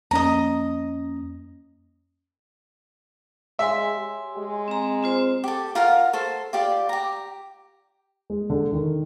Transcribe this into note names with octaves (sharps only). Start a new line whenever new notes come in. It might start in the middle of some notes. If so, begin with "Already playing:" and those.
F2 A#3 C#4 D#5 A#5
G#3 C#5 E5 G#5 C6
G4
G#3
C4 A#5
C4 F4 C5
G4 A4
F4 A#4 F5 F#5
A4 C5
F4 G4 D5
G4 A#5
G#3
D3
D#3